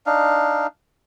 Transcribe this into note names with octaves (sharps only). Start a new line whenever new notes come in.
D4 D#4 F5